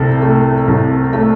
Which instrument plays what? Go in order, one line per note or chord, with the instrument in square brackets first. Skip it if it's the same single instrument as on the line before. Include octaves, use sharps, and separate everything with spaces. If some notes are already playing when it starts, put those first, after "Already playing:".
Already playing: [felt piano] C2 C3 A4
A3
C2
A3